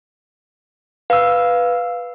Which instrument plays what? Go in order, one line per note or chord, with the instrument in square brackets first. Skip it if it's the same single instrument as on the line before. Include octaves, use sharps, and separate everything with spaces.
[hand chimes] B4 [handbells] F5 E6